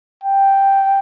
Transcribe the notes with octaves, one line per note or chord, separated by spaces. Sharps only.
G5